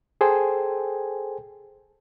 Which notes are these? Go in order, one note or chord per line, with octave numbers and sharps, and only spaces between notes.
G#4 A4 C5 G5 G#5